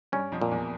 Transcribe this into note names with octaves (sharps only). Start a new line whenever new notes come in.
G2 G3 C#4
F2 F3
A#2
E2 E3